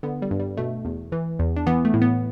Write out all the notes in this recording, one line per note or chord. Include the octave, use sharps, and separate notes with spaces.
D3 B3
G3
G2
G3
B2 A3
E2
E3
E2
D4
E3 B3
A3
A2
B3